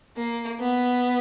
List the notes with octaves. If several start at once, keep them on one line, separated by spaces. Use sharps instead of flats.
A#3
B3